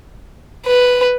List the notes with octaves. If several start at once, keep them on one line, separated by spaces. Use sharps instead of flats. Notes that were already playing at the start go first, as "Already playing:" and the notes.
B4